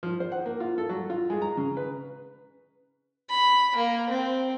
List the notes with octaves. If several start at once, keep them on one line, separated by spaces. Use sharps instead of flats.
F3
C5
F#5
A#3
F4
A4
F#3
F4
G#3
A#5
C#3
B4
B5
A#3
C4